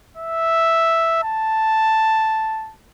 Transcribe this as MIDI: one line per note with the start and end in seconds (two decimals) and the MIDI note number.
0.17 1.22 76
1.24 2.73 81